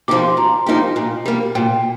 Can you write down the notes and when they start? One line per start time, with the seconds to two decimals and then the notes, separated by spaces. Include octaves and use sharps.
0.08 F3 A#3 D#4 G4 D6
0.23 C6
0.37 A#2 A#5
0.66 F3 A#3 D#4 G4
0.96 A#2
1.26 G3 A#3
1.55 A#2 G5